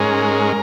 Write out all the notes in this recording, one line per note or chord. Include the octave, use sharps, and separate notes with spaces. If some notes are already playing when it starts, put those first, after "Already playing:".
Already playing: G#2 G#3 C#4 A#4